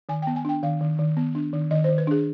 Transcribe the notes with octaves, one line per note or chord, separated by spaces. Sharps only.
D#3 G#5
B3 G5
G#5
D4 G5
D#3 F5
D#3
D#3
B3
D4
D#3
D#3 D#5
D#3 C5
B4
D4 G#4